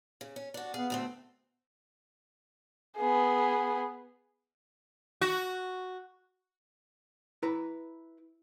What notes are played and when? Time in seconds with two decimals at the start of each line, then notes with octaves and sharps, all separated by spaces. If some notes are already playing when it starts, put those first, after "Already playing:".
0.21 C#3
0.36 C#4
0.54 D4 F#4
0.74 B3 G#4 F5
0.90 D2 A3 C4
2.98 B3 G#4
5.21 F#4
7.43 E4 B4 A#5